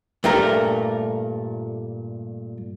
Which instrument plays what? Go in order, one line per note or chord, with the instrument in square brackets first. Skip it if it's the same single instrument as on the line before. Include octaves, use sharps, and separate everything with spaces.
[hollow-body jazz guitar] G2 A#2 A3 A#4 A#5